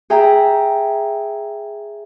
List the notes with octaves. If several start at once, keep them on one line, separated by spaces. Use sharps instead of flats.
G#4 E5 G5 A#5